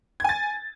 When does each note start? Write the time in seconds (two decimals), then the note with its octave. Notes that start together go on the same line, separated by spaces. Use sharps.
0.20 G#6
0.24 G#5
0.29 A6